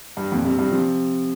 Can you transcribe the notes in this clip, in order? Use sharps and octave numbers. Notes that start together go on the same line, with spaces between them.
G2
F2 A#2
G2 C3
G2 C3
C3 F3